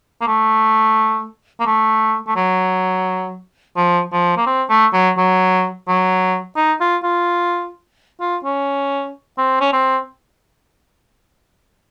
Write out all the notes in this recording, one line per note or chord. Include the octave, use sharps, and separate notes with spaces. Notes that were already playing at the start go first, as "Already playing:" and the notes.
A#3
A3
A#3
A3
A3
F#3
F3
F3
A#3
C4
A3
F#3
F#3
F#3
D#4
F4
F4
F4
C#4
C4
C#4
C4